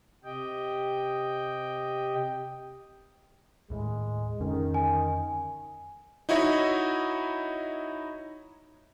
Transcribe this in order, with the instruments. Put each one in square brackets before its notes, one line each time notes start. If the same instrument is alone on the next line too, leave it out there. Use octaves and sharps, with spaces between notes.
[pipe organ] C3 G4 D#5 G5
[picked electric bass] D#2 A2 [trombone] G#3
[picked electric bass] F2 D3 C#4 [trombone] D#3
[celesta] G#5
[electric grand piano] D#4 E4 F#4 C#5 D#5 E5